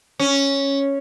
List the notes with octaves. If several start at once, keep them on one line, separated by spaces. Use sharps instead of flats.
C#4